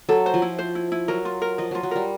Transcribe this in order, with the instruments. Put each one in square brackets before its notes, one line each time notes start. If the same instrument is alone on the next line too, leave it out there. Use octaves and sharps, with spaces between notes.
[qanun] F#3 [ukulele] A4
[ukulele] C5
[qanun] F3
[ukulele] E4
C5
E4
E4
[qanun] F#3 [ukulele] A#4
[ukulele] F4
A#4
[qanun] F3 [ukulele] D#5
[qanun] F#3 [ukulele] F4
[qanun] F#3
[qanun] G3 [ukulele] A#4